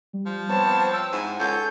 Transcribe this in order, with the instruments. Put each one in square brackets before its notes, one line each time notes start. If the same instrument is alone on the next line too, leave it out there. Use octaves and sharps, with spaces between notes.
[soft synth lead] G3
[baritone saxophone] F3
[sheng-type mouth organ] B3 C4 C#5 [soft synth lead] C5 [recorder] A5
[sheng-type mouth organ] G5 [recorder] E6
[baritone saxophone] G#2 [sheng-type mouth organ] E4 [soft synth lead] F#5 [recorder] G#5
[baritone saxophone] C#2 [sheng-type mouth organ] A4 C#5 [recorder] G6